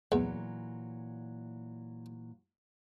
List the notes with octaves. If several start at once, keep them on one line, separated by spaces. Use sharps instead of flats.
E2 A#2 E3 F#3